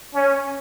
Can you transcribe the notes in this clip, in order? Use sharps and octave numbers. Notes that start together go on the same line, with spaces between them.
C#4